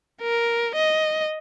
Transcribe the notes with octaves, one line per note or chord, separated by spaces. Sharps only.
A#4
D#5